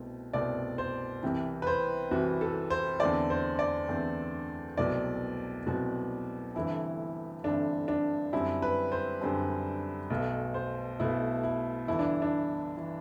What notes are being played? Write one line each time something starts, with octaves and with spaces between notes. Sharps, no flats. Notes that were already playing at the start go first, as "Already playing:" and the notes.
Already playing: C2 B2 A3 C4
C2 B2 A3 C4 D5
C5
C2 C3 E3
B4
C5
C2 C3 E3 F#4
A4
C5
E2 D3 A3 C4 D5
C5
D5
E2 D3 A3 C4
C2 B2 F#3 A3 C4 D5
C2 B2 F#3 A3 C4 F#4
G1 G2 E3 A3 C4 E4
G1 G2 E3 A3 C4 D4
D4
F#2 D3 G3 C4 E4
B4
C5
F#2 D3 G3 C4
B1 B2 A3
C5
B1 B2 A3 E4
E4
G1 G2 E3 E4
D4
D4
E3